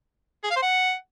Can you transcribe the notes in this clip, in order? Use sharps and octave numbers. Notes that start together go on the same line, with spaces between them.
G#4
F5
C5
F#5